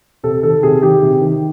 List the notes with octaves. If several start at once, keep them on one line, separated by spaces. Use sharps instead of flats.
C3 A4
D#3 A4
C3 G#4
D#3 G4
C3
D#3